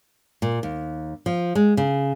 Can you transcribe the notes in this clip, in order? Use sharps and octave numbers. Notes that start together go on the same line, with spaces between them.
A#2
D#2
F3
G#3
C#3